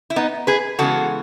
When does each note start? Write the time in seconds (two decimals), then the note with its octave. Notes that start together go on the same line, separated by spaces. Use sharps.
0.10 E4
0.16 B3 D#4
0.47 G#4 B4
0.79 C#3 E3 G#3 B3 F#4 A4